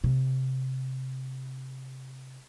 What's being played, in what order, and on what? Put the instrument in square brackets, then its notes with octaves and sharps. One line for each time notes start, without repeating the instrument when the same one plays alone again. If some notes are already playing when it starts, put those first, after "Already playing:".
[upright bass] C3